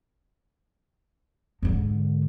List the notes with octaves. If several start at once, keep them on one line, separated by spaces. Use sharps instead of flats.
G#2 D3